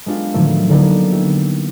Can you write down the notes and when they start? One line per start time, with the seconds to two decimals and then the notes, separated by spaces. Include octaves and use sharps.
0.06 G#3 B3 D4 F4 G4
0.34 A2 D3 D#3 F3 F#3 A3
0.70 D3 A#3 B3 D#4 D5
1.12 E4 G4